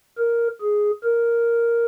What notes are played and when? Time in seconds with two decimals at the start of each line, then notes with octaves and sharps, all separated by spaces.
0.18 A#4
0.61 G#4
1.04 A#4